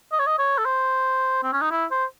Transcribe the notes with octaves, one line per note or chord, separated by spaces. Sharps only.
D#5
C#5
D#5
C#5
A4
C5
C4
C#4
D#4
E4
C5